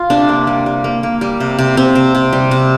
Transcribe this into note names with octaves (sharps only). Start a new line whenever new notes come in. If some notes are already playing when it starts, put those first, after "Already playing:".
Already playing: F4
C3 D4
A#3
G3
G3
A#3
A#3
G3
C3
C3
C3 C4
C3
C3
G3
C3